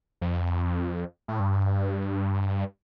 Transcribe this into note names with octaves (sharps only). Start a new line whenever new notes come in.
F2
A2
G2